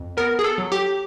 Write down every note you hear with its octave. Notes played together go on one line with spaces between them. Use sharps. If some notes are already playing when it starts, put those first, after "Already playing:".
Already playing: F2
B3 A#4
G#4
A4
F#3
G4